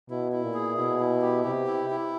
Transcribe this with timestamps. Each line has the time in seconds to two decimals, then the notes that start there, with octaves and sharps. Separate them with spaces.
0.10 B2 E4
0.32 E4
0.43 A#2
0.54 G#4
0.77 B2 E4
0.99 E4
1.22 G4
1.44 C3 G4
1.67 E4
1.90 E4